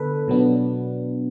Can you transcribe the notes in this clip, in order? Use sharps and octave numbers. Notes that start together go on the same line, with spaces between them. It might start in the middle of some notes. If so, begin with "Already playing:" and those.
Already playing: D3 B3 D4 A4 B4
B2 F#3 B3 D4